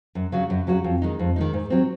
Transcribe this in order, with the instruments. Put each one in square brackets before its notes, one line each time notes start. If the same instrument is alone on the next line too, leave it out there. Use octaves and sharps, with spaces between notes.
[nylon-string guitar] F#2
C#3 F#3 C#4 F#4
F#2
C#3 F#3 C#4 F#4
F2
D#3 G#3 D#4
F2
D#3 G#3 D#4
G#2
F#3 C4